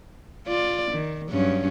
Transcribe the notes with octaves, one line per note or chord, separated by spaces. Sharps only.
F4 D5
D#3
G2 F#3 C#4